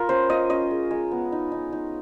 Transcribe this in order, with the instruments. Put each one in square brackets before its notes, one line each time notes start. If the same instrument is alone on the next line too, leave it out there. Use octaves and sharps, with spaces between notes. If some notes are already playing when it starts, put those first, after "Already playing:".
Already playing: [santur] F4 A#4
C#4 C5
F4 D#5
C#4 D#5
G#3
G#3
B3
D#4
D#4
D#4